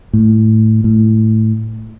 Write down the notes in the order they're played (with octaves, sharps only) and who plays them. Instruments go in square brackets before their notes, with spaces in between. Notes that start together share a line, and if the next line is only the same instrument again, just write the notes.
[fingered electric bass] A2
A2